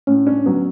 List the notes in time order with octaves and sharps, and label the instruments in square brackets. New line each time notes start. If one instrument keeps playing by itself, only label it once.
[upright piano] A2 [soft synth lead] C#4
[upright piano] C#4 [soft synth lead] D4
[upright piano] F#3 [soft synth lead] B3